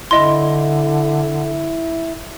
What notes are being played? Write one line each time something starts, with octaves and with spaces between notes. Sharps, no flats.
D3 E4 D#5 C6